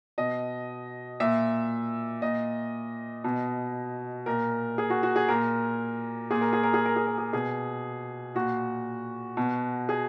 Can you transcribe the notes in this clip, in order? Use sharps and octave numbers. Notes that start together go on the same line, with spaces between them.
B2 D#5
A#2 E5
A#2 D#5
B2
A#2 A#4
G#4
F#4
F#4
G#4
A#2 A#4
A#2 G#4
A#4
G#4
A#4
G#4
A#4
G#4
A#4
G#4
B2 G#4
A#2 F#4
B2
G#4